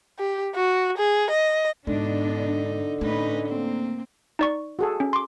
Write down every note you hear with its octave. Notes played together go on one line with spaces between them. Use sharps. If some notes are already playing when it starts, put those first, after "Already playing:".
G4
F#4
G#4
D#5
G#2 B2 D3 D4 D#4
A2 A3 C#4 D#4 B4
A#3 C4
D#4 D5 C#6
F#4 G#4 A4
C#4
C6 D6